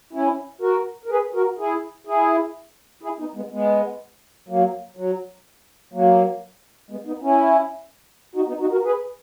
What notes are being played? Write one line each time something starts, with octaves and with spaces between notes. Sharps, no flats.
C#4 E4
F#4 A#4
A#4
G#4 B4
F#4 A#4
E4 G#4
E4 G#4
E4 G#4
B3 D#4
G#3 B3
G#3 B3
F#3 A#3
F#3
F#3 A#3
G#3 B3
B3 D#4
C#4 E4
D#4 F#4
B3 D#4
D#4 F#4
F#4 A#4
G#4 B4